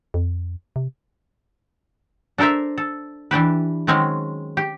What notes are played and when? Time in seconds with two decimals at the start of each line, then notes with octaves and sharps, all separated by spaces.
0.14 F2
0.76 C3
2.38 D4 A4 A#4 C5 E5
2.78 A4
3.31 E3 D4 G4 B4
3.87 D#3 F#3 G#3 C4 C#4
4.57 G4